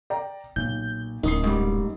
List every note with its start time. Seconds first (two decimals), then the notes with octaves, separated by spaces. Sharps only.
0.10 D5 G5 A#5
0.56 B1 A#2 G6
1.23 D1 F#2 D#4 D#6 C7
1.44 G#2 G3